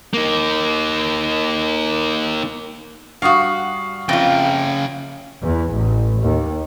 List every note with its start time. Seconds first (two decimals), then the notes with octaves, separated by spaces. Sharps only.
0.14 A#3 D#4
3.22 G2 F#4 F5 C#6 D#6
4.09 F2 C#3 F4 G5
5.43 E2
5.74 A1
6.22 D#2